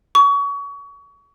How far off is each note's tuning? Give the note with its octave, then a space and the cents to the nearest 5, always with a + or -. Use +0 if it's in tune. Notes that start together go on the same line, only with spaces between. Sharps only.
C#6 +30